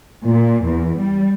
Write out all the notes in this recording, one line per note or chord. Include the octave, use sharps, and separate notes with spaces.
A#2
E2
G3